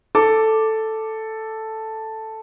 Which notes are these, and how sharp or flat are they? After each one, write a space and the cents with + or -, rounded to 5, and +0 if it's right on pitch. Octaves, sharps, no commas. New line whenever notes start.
A4 +0 D6 +0